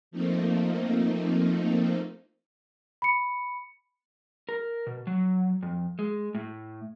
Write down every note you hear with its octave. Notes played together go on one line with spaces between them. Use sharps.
F3 A3 A#3 C4 D#4
B5 C#7
A#4
B2
F#3
F2
G#3
A2